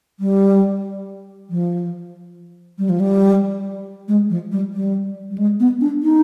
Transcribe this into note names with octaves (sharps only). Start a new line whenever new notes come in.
G3
F3
G3
F3
G3
G#3
F3
G3
G3
G3
G#3
B3
D4
D#4